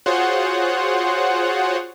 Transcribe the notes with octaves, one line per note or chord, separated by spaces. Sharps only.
F4 F#4 G#4 C5 C#5 F#5